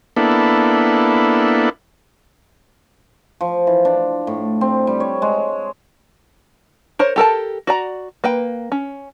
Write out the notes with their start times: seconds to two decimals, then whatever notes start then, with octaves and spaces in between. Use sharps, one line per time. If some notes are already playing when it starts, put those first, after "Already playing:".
0.16 A#3 B3 D4 E4 A4
3.41 F3
3.67 E3
3.85 D4
4.27 A2
4.61 C4
4.87 G3
5.00 C#5
5.22 G#3
6.99 A#4 C5 C#5
7.16 G4 A4 A#4 A5
7.67 F#4 D5 A#5
8.24 A#3 B4 G5
8.72 C#4